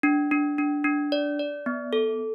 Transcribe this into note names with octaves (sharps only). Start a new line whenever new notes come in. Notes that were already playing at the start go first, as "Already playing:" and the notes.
D4
D4
D4
D4
D5
D5
B3
A4